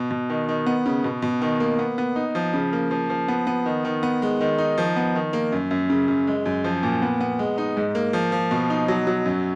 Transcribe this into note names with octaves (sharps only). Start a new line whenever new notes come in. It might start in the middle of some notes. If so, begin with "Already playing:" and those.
Already playing: B2
B2
D#3
D#3
B3
C#3
B2
B2
D#3
A#3
B3
B3
D#4
F3
C#3
A#3
F3
F3
B3
B3
D#3
D#3
B3
G#3
D#3
D#4
F3
B3
D#3
A#3
F#2
F#2
C#3
F#2
G#3
F#2
F3
A#2
B3
B3
G#3
D#4
G#2
A#3
F3
F3
B2
D#4
F#3
F#3
F#2